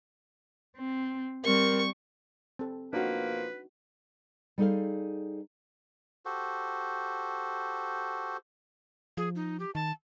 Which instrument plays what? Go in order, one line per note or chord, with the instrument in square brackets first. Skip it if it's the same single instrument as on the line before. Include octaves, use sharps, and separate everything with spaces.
[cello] C4
[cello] G3 C4 [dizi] A#4 [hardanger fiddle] C#6
[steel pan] C4 A4
[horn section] B2 F3 A#3 [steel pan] D4 D#4 F#4 [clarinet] B4
[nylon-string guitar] G3 D#4 G#4 A4 C5 F5
[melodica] F#4 G4 A4 C5
[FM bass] F3 [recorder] G#4
[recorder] D#4
G4
[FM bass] D#3 [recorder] A5